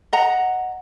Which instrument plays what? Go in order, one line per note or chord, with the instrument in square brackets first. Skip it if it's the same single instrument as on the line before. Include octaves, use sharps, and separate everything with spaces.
[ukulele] D#5 F#5 A#5